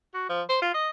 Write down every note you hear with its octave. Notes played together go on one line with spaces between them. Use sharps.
F#4
F3
C5
F4
D#5